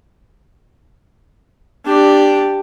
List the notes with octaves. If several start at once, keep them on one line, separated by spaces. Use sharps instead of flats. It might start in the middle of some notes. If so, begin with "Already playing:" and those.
D4 G4